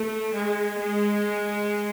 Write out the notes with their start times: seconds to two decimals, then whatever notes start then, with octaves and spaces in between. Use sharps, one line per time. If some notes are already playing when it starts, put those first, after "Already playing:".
Already playing: A3
0.35 G#3
0.80 G#3